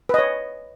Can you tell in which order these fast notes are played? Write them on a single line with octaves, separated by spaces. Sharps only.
B4 D#5 C#5